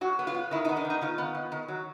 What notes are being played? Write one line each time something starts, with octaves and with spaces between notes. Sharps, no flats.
F#3 F#4
B3
F4
B3
D#3 E4
D#4
B3
D4
D#3
D#4
D#3 F4
B3
D#3
D#3
F#3